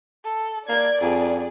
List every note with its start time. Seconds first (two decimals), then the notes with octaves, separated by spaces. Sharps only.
0.24 A4
0.69 A#3 D5 G#6
1.01 F2 G#4